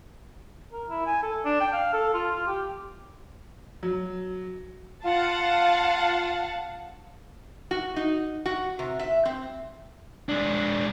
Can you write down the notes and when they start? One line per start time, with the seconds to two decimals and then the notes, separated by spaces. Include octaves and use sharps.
0.73 A#4
0.90 E4
1.07 G#5
1.23 A4
1.45 D4
1.60 G5
1.73 F5
1.93 A4
2.14 F4
2.32 F4
2.47 G4
3.83 F#3
5.05 F4 F5 F#5 A5
7.71 F#4
7.96 D#4
8.46 F#4
8.79 C3
8.99 E5
9.25 C4
10.29 G#3 D4